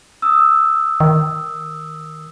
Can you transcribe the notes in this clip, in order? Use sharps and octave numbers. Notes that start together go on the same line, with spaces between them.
D#6 E6
D#3